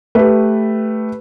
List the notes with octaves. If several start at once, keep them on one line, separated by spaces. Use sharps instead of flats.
A3 G4 B4